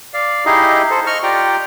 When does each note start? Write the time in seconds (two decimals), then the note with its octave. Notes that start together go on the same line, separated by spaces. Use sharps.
0.14 D5 F5
0.46 D#4 E4 G4 G#4 D#5 F5
0.90 A4 C5
1.07 D#5 C#6 F6
1.23 F4 G4 D5 G5 A#5